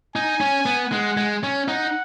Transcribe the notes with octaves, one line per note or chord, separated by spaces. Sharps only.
D#4 G#5
C#4
B3
G#3 F#5
G#3
C#4
D#4 F#5